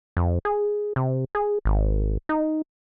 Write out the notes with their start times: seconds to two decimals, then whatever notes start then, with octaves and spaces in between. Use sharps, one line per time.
0.17 F2
0.45 G#4
0.96 C3
1.35 G#4
1.65 G#1
2.29 D#4